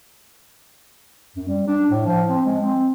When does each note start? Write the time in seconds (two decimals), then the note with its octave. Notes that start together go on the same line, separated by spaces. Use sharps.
1.36 F#2
1.48 G3
1.68 D4
1.90 A2
2.06 F3
2.29 C4
2.45 G#3
2.60 C4